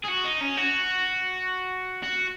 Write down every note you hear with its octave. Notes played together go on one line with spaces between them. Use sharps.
G#4
F#4
D#4
C#4
F#4
F#4